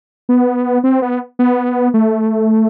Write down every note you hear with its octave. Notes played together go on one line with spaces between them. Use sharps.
B3
C4
B3
B3
A3